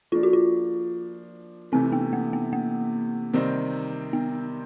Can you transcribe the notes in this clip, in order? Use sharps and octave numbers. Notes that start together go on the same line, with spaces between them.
F3 A#3 D4 F4
F#4
F4
C3 E3 A3 C4
B3
A#3
B3
A#3
C3 D#3 G3 C4 D#4
B3